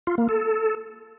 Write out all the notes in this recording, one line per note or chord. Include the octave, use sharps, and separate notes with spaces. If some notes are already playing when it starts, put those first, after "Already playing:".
F4
A#3
A4